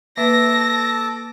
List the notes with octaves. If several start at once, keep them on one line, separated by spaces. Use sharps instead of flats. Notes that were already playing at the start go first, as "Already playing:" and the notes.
A#3 A4 B4 E5 A5 D6 A#6